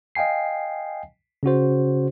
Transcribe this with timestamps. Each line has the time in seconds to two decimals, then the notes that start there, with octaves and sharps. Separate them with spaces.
0.15 D#5 F5 G5 G#5 C7
1.43 C#3 C#4 F#4 C5